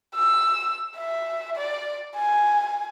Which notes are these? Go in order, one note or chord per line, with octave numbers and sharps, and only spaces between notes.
E6
E5
D5
G#5